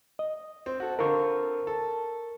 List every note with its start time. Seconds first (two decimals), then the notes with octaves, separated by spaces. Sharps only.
0.19 D#5
0.66 C4
0.80 F#4 A4
0.99 D3 C4 F4 A#4 C#6
1.67 A4